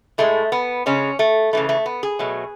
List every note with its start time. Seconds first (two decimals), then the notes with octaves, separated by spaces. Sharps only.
0.18 A2 G#3 A3
0.52 B3
0.86 C#3 G#3 C#4
1.19 A3
1.53 C#3 E3 A3
1.69 A3
1.86 B3
2.03 G#4
2.19 B2 F#3 A3